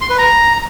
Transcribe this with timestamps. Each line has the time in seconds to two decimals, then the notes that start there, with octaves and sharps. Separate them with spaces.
0.01 C6
0.10 B4
0.18 A#5